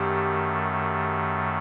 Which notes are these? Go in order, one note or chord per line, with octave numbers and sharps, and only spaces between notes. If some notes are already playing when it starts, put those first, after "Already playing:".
Already playing: F#2 D#3 A3 G4